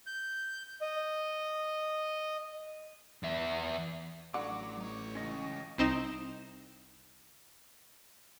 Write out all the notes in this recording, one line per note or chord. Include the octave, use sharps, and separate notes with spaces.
G6
D#5
E2 E5
A1 D3 F#3 F#5 D6
D#4 C#5
C#2 C#3 C#4 D#5
C2 C4 D#4 E7